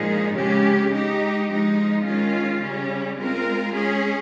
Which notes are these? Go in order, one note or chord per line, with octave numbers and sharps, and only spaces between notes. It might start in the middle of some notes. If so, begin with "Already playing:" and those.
Already playing: A#2 F3 G#3 D#4 G#4
C#3 G#3 C#4 G4
G#3 D#4 G4
F3 G#3 D#4
D#3 G#3 C#4 F4
C#3 G3 C#4
G#3 C4 F4 A#4
G#3 C#4 G#4